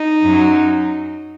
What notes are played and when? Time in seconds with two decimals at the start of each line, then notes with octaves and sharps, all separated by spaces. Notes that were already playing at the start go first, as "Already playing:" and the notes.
Already playing: D#4
0.23 F#2 F#3